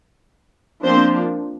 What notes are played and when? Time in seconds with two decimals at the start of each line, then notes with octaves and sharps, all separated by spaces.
0.84 F3 A#3 C4 D4 C5